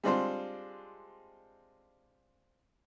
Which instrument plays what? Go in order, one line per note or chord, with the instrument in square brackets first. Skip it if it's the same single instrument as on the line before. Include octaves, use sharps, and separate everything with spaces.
[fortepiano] G3 G#3 C4 D4 F4 C5